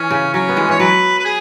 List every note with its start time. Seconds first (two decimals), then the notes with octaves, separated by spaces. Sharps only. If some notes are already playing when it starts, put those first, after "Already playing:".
Already playing: E3 C#4
0.11 C#3
0.34 F#3 C#4
0.49 B3
0.56 E3 G#3
0.69 E3 C#5
0.80 F#3 B4
1.19 B4
1.25 G#4